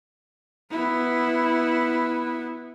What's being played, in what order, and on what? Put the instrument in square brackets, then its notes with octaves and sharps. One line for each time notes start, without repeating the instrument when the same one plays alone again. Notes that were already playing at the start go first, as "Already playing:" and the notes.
[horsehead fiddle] B3 E4